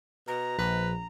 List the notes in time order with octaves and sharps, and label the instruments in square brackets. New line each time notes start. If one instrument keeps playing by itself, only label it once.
[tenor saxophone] B2 [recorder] A#5
[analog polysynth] A#1 [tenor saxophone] B4